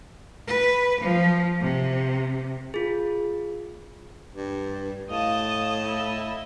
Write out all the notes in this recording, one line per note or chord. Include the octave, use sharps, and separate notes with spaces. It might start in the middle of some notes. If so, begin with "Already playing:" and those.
B4
F3
C3
F4 G#4
G2
A2 D#5 F5 A5 D#6
E4